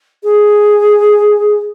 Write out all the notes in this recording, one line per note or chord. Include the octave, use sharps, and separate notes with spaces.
G#4